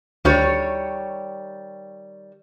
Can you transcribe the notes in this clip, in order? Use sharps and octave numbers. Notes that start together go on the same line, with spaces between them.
D2 D#3 G3 C#5